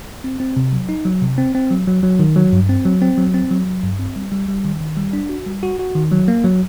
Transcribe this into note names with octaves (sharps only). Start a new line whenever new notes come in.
C4
C4
C3
F#3
D#4
F#3
C3
C4
C4
F#3
F#3
F#3
D#3
F#3
G2
C4
F#3
C4
F#3
C4
F#3
F#3
G2
C4
G3
G3
G3
D#3
D#3
G3
D4
F#4
G3
F#4
F#4
D#3
F#3
A#3
F#3